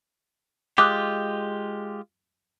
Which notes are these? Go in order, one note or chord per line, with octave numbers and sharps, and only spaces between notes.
G#3 F4 G4 D6 D#6 F#6